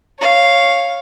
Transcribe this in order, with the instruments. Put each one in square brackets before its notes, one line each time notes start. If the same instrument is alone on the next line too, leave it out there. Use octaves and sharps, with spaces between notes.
[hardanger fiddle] C#5 F5